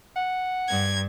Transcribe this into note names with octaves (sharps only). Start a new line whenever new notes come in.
F#5
G2 G#6